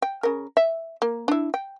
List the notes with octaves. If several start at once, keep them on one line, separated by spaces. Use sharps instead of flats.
G5
C#3 A#4
E5
A#3
D4 E4
G5